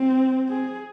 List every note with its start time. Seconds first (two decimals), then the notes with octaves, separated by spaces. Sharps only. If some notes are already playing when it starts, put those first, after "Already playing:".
Already playing: C4
0.49 G#4